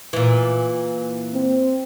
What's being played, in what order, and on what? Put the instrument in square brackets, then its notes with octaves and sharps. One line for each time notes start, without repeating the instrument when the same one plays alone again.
[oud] A#2 E3
[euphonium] C4